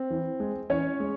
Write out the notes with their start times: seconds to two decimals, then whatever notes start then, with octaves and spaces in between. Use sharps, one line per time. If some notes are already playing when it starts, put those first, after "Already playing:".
Already playing: C4
0.10 E3
0.40 G#3
0.70 E3 C#4 C#5
1.00 G#3